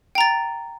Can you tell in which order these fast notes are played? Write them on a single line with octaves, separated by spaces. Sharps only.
G5 A#5 A6